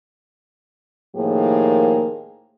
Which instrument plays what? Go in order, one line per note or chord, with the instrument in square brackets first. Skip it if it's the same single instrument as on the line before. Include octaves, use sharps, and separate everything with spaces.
[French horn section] A2 D#3 F3 A#3 G4 G#4